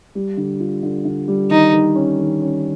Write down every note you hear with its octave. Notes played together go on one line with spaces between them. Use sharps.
G3
D3
F4
D3
D3
G3
D#3 D#4
D#3
C#4
D#3
C#4